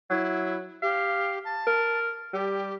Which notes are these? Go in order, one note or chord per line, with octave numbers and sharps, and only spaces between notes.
F#3 E4
G4 F5
A5
A#4
G3 G4